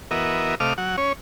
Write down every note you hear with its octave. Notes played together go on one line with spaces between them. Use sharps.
E3 B3 F#4 A#4 D#5 E5
C3 A3 D#5 F5 D6 F6
F#3 F#5
C#4 C#5